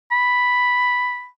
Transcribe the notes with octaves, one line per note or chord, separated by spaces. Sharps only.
B5